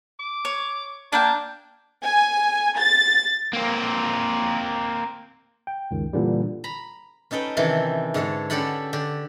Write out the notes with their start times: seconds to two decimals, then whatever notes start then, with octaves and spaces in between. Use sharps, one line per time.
0.19 D6
0.45 C#5
1.12 A#3 D4 A#4 G5
2.04 G#5
2.78 A6
3.53 A#3 C4
5.67 G5
5.91 C#2 F#2 D#3
6.13 A#2 D3 E3 G3
6.64 A#5 B5
7.31 C#4 D#4 A4 B4 G5
7.57 C3 D#3 E3 C#4 A4
8.14 G#2 D3 A4 C#5
8.50 D3 C#4 G4 A4 F#5 B5
8.93 D3 G4